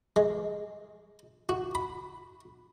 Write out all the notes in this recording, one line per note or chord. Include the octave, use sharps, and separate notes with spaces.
G#3
F#4
B5